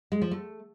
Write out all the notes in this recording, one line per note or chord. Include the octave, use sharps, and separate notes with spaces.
G#3
F3
A3